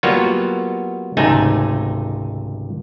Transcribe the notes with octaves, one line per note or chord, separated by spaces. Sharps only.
F#3 G3 A#3 B3 F4 C#5
G#1 C#2 C3 A3 D#4 G#5